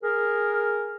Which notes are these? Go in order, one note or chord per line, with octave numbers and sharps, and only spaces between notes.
G#4 A#4